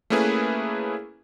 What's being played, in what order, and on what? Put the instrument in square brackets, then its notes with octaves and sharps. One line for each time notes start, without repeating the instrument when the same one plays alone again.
[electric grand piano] A3 A#3 C#4 E4 G#4 B4